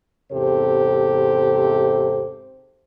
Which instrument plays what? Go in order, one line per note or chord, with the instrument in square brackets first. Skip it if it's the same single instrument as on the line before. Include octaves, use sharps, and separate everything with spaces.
[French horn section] E2 G#2 C3 G4 A4 C5